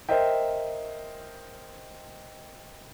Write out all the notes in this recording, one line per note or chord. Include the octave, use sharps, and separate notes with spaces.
A#4 C5 D#5 E5 G5